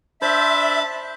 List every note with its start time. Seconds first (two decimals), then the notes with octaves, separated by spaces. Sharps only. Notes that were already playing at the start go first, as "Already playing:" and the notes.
0.22 D4 C5 E5 A5 B5